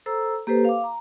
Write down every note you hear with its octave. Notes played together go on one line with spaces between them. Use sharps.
A4 C5 A#5 E6
A#3 G4 A4 B4 C5
F5 D6
A#5